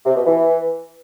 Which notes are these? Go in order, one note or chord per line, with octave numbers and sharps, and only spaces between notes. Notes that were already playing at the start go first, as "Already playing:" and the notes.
C3
B2
E3